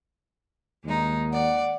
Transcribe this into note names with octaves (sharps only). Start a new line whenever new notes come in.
D#2 G#3 D#4
D5 F#5